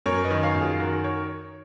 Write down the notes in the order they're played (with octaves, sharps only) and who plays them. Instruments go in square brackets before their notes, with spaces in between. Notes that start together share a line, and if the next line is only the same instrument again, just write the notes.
[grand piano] F#2 A#4 C#5
B4 D#5
D#3
C#5 F5
F#2
F4 G#4
D#3 F#4 A#4
A#4 C#5